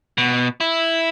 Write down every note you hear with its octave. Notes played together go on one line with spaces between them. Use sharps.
B2
E4